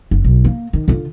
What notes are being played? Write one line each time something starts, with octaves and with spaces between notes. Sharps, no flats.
F#1
B1
A#3
D#3
D3 F4